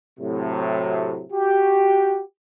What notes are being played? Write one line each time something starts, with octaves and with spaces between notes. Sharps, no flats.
A2 C3 F#3
F#4 G4